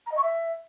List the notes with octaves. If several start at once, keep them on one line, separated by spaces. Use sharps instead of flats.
A#5
D#5
C#6
E5